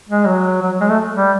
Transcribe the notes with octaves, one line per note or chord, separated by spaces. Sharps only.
G#3
F#3
F#3
G#3
A3
G3